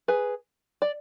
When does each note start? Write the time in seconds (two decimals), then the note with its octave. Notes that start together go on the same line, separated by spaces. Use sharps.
0.08 G#4 B4
0.82 D5